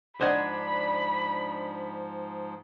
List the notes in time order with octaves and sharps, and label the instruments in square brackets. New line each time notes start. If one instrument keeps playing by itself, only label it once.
[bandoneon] G#2 F3 [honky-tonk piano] D4 G#6 [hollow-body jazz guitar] C5 D#5 F#5 [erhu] B5